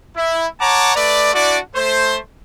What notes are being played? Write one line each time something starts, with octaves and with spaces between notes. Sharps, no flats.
E4
C#5 F#5 A5 A#5 D6
A3 B4 D5
D4 E4 F#4 D5
A3 C5